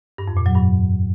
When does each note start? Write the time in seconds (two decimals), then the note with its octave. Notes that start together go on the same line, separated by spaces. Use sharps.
0.18 G2
0.28 F2
0.37 A#2
0.46 F#3
0.55 G2